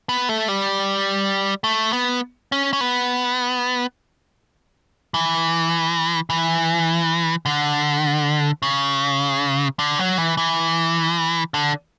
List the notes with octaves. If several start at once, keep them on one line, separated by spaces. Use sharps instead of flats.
B3
A3
G3
A3
B3
C#4
C#4
B3
E3
E3
D3
C#3
D3
F#3
E3
E3
D3